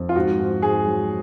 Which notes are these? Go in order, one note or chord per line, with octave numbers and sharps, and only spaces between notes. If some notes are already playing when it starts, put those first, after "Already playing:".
Already playing: F2
F4
G#2 F#4
G#2
G#2 G#4
F#3